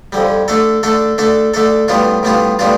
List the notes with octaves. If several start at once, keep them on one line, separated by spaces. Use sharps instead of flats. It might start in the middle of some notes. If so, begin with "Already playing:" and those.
F2 D3 G3
D3 A3 D4 A4
D3 A3 D4 A4
D3 A3 D4 A4
D3 A3 D4 A4
A2 G3 B3 D4 F4
A2 G3 B3 D4 F4
A2 G3 B3 D4 F4